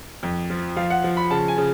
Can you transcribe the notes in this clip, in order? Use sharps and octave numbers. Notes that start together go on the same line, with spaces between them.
F2
F3
F3 F5
F#5
F3
B5
C#3 A5
G#5
C#3